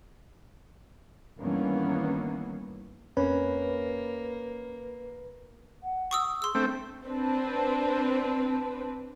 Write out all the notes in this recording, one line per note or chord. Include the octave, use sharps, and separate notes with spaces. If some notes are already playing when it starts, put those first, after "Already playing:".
G2 D#3 E3 A#3 B3 C#4
F2 A#3 C4 C#4 B4
F#5
C#6 D#6 E6
G#4 C6 E6
A3 C4 D4
C4 D4 B4